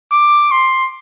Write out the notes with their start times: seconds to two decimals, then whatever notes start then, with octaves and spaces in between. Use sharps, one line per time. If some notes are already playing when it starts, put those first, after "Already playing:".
0.12 D6
0.51 C6